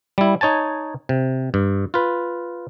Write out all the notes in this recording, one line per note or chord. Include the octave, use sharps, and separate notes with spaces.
G3 E4
D#4 C#5 G#5 A5
C3
G2
F4 B4